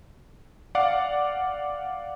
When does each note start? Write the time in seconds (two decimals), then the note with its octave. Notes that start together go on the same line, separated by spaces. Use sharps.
0.75 D5 F5 F#5 D6